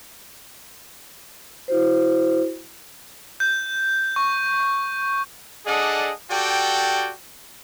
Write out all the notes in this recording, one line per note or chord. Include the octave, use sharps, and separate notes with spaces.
E4 F#4 C5
G6
C#6
D4 G#4 A4 D5 D#5 F#5
F#4 G4 A4 D5 G5